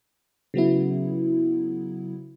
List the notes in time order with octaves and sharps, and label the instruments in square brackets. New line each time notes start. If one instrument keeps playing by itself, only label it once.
[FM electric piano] C#3 F#3 B3 E4